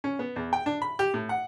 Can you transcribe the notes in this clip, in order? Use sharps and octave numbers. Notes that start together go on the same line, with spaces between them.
C#4
B3
E2
G5
D4
B5
G4
A2
F#5